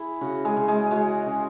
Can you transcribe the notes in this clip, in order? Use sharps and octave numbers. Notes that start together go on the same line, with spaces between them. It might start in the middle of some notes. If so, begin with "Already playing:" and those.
Already playing: E4 G#4
C#3 F#4
G#3 G#4
C#3
G#3 G#4
G#3 F#4
C#3